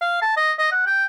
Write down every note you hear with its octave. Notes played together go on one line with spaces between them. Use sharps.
F5
A5
D#5
D#5
F#5
G5